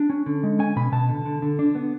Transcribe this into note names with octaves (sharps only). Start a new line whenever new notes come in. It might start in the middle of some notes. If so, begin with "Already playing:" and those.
Already playing: D4
C#4
D3
G#3
C#4 G#5
B2 B5
B2 A5
D3
D3
D3
D4
B3